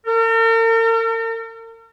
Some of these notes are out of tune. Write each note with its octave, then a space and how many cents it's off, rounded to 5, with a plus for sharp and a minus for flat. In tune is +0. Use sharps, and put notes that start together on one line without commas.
A#4 -45